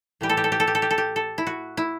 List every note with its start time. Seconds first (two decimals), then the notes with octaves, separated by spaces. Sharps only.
0.21 A2 E3 G3 G4
0.29 A4
0.37 G4
0.44 A4
0.52 G4
0.60 A4
0.67 G4
0.75 A4
0.82 G4
0.90 A4
0.98 G4
1.16 A4
1.38 E4
1.47 F#4
1.77 E4